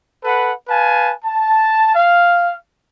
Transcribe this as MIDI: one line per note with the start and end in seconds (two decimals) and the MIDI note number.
0.25 0.53 69
0.25 0.53 71
0.25 0.53 78
0.25 0.53 83
0.68 1.12 71
0.68 1.12 77
0.68 1.12 80
0.68 1.12 81
1.24 1.92 81
1.94 2.53 77